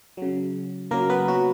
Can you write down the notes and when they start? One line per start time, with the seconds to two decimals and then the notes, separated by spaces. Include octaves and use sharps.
0.17 C#3 F#3
0.91 C#3 F#3 A#3 A#4
1.09 B3 B4
1.28 F#3 F#4